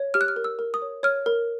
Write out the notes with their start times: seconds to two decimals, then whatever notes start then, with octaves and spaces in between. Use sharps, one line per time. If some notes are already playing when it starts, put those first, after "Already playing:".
Already playing: C#5
0.14 G4 F6
0.21 F#6
0.28 F6
0.36 A#4
0.44 E6
0.59 A#4
0.74 D#6
0.82 C#5
1.03 C#5 F6
1.26 A#4